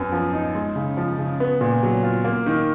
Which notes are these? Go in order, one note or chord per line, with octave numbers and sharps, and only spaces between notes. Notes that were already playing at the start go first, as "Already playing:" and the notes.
Already playing: F#2 B3
F3
D#4
G#3
C#3
F3
C#3
B3
A#2
F#3
F4
A#3
D#3